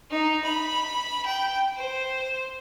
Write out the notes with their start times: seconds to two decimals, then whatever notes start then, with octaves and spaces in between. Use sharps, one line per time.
0.11 D#4
0.44 B5
1.26 G5
1.76 C5